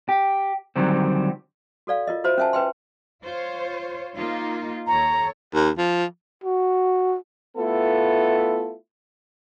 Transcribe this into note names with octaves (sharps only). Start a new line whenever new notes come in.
G4
D3 D#3 F#3 G3 C4
F#4 A4 D5 F5
F4 A#4 D#5
F4 F#4 C5 E5 B5
C#4 A#4 E5 G#5 A5
C#4 B4 E5 G5 C6
F4 C5 C#5
A#3 D#4 F4
D#2 A4 C#5 A#5
D#2
F3
F#4
A3 B3 E4 F4 A4